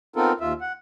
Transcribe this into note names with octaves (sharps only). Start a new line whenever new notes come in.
B3 C4 D#4 F4 A4 A#4
D#2 F4 E5
F#5